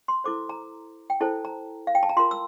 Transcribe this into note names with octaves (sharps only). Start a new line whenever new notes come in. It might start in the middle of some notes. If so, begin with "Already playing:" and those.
C6
E4 A4 C5 D6
A#5
G5
E4 A4 C5 A5
A#5
F5
G5
A5
A#5
F4 A#4 C6
E6